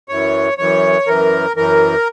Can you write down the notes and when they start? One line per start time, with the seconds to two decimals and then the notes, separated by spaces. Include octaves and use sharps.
0.09 F#2 E3 C#5
0.58 F#2 E3 C#5
1.07 F#2 E3 A#4
1.56 F#2 E3 A#4